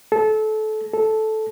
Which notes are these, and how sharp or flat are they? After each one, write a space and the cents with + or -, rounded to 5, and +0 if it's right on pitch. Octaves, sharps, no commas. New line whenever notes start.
A4 -25
A4 -10